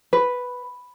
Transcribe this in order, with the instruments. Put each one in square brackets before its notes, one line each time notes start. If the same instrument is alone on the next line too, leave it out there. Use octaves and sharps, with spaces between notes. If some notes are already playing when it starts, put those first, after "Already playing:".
[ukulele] B4